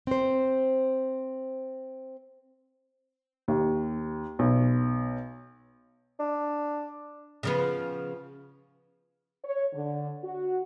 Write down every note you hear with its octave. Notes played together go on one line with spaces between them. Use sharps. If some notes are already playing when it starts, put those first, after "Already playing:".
C4 C5
D#2
B1
D4
C#3 F3 B3
C#5
D3
F#4